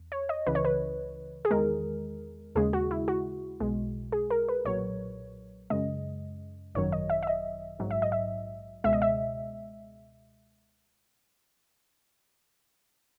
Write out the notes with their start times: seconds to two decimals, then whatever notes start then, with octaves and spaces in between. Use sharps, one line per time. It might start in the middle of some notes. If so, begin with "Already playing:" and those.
Already playing: E2
0.12 C#5
0.29 D#5
0.46 C#2 C#3 E3 B4
0.55 C#5
0.65 B4
1.45 G#4
1.51 E2 D#3 G#3 A#4
2.55 D#2 C#3 G#3 G#4
2.73 F#4
2.91 E4
3.08 F#4
3.60 B1 B2 G#3
4.12 G#4
4.30 A#4
4.48 B4
4.65 B1 A#2 F#3 C#5
5.70 F#2 C#3 G#3 D#5
6.75 G#1 F#2 D#3 F#3 C#5
6.92 D#5
7.10 E5
7.23 E5
7.27 D#5
7.79 A#1 G#2 F#3
7.91 E5
8.02 D#5
8.12 E5
8.84 C#2 B2 G#3 E5
8.93 D#5
9.02 E5